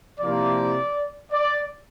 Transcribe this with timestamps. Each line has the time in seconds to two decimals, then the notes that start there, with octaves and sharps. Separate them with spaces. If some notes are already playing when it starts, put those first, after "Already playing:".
0.20 C3 F3 A#3 E4 D5
1.32 D5